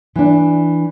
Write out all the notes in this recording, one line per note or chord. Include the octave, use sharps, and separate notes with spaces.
E3 D4